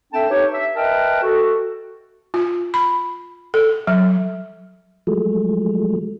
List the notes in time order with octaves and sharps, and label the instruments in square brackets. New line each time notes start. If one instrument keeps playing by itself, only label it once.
[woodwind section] C4 D4 A4 E5 G5 A5
D#4 G4 B4 C#5
E5
A#4 B4 D#5 E5 G5 A5
F#4 A4
[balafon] F4
B5
A4
F#3
[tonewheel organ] F3 F#3 G#3 A3